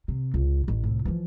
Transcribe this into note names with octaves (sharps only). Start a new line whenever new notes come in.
C3
C#2
A1
C2 A2
E3 F3